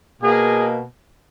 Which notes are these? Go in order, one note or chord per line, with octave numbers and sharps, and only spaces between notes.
B2 A#3 G#4